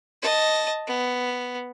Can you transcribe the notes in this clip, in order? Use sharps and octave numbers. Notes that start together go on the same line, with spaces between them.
D#5 A5
B3